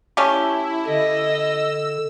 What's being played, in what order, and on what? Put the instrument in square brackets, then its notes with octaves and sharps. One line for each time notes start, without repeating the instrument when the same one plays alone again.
[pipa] A3 C#4 G4 [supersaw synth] E4
[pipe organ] D3 [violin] D#5 [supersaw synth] E6